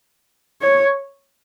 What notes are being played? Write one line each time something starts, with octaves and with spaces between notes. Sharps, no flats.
C#5